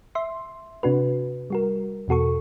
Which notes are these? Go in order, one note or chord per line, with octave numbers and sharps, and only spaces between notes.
E5 C6
C3 D4 F#4 B4
G3 F#4 A#4
E2 B2 F#4 A4 C#6